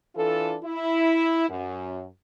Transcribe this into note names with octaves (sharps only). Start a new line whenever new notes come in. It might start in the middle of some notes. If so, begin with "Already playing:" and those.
E3 D4 F4 A4
E4
F#2